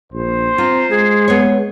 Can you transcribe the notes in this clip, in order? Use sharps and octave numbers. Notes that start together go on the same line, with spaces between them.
A#1 C5
C4 F4 A#5
G#3 G#4
B3 C#5